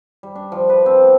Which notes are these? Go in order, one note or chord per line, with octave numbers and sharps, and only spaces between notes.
G3
D4
F3
B4
C4
B3